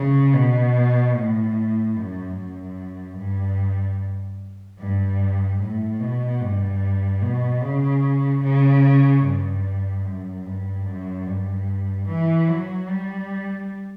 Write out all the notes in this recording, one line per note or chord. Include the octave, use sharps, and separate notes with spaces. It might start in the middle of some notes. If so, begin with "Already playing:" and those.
Already playing: C#3
B2
A2
F#2
F#2
G2
G2
A2
B2
G2
B2
C#3
C#3
G2
F#2
G2
F#2
G2
E3
F#3
G3